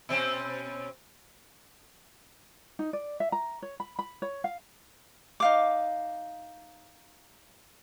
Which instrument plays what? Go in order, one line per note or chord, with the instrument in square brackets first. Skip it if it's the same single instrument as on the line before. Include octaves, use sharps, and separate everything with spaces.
[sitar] B2 C4 C#4
[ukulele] D#4
D5
E5
A#5
C#5
B5
B5
C#5
F5
[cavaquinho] D#4 F5 D6